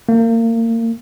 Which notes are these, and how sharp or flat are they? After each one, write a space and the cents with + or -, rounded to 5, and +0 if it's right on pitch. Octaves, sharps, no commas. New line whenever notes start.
A#3 -30